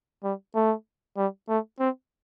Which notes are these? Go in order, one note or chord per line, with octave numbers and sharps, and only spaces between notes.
G3
A3
G3
A3
C4